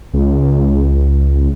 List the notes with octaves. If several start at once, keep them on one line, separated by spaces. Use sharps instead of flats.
C#2